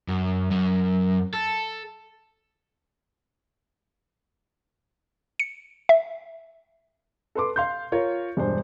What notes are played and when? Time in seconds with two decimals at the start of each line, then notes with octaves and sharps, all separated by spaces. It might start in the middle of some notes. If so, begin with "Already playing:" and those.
0.08 F#2
0.51 F#2
1.33 A4
5.40 C#7
5.89 E5
7.35 A4 B4 C6 D6
7.56 F5 C6 G6
7.92 F4 A#4 C#5
8.37 E1 G2 C5